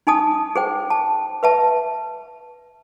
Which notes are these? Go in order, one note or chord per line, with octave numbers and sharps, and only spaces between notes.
D#4 G#5 A5 D#6
G#4 C5 G5
A5
B4 E5 A5